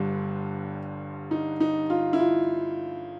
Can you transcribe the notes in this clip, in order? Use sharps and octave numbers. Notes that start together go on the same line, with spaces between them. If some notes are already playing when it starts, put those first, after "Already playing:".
Already playing: G1 G2 D3 G3 D4
D#4
D#4
F4
E4
F4